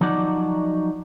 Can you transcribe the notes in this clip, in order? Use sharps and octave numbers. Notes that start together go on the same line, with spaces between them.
F3 F#3 D#4 D5 F#5